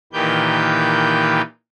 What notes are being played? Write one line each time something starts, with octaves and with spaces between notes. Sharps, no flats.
A#2 D#3 E3 G4 B4 G6